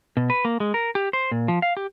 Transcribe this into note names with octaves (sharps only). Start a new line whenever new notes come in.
B2
B4
A#3
G#3
A#4
G4
C5
A#2
F3
F5
G4